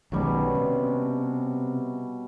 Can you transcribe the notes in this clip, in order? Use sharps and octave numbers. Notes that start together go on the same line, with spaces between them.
B1 B2 D#3 G3 G#3 C#4
C3